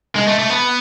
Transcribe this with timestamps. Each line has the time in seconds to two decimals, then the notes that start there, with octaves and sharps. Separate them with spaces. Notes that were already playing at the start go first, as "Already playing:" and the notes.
0.16 G#3
0.27 A3
0.39 A3
0.50 B3